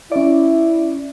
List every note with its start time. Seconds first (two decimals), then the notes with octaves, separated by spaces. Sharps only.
0.12 C#4 E4 D5